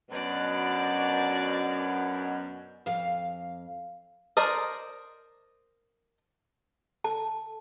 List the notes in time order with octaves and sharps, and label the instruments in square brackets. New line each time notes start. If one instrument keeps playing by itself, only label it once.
[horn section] F#2 B2 [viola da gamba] D4 F#4 D5
[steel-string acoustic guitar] F2 F5
[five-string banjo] A#4 C5 D5 D#5
[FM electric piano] A4 [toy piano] A5